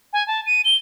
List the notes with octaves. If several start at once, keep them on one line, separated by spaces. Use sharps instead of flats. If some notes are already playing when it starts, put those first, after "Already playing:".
G#5
A5
D#7
G7